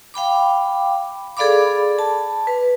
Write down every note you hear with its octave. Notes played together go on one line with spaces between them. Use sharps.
F5 G5 B5 D6
G#4 A4 D5 F5 B5 D6
A5
B4